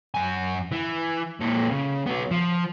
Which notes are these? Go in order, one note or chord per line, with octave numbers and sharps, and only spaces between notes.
F#2 G#5
E3
A#2 A4
C#3
F#3 B3
F3